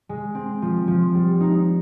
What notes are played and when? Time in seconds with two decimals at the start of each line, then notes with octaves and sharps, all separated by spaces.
0.09 G#3
0.35 C4
0.62 F3
0.88 F3
1.15 G3
1.40 D#4